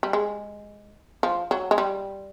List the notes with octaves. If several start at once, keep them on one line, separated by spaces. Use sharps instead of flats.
G3
G#3
F3
F#3
G#3
G3